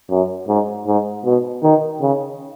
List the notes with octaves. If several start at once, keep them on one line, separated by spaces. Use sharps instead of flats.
F#2
G#2
G#2
B2
D#3
C#3